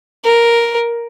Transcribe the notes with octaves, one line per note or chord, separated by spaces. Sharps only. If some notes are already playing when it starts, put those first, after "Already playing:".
A#4